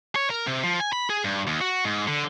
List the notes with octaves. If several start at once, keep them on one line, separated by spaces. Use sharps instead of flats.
C#5
A#4
C3
F3
G#5
B5
G#4
G2
D#2
F#4
G#2
D3